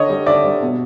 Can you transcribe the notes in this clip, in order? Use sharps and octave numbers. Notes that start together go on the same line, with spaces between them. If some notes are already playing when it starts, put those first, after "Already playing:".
Already playing: D3 C#5 D#5
G3
D3 D5 E5
G3
B2